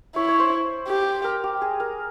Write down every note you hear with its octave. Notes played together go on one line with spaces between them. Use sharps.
E4 C#5
C#5
C5
G4
A#4
G4
G#4
A#4